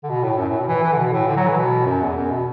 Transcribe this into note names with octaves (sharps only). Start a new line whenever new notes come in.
D3
B2
A2
F#2
A2
B2
E3
E3
D3
B2
A2
D3
F#3
E3
B2
F#2
E2
F#2
B2